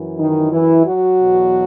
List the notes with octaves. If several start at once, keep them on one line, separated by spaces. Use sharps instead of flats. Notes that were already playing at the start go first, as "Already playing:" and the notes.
Already playing: F#2 E3
D#3 D#4
E3 E4
F#3 F#4
E2 B2